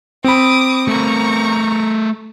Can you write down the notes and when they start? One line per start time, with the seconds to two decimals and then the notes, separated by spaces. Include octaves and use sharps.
0.24 C4 B5 D6 D#6
0.88 A3 A#4 A#5 C#6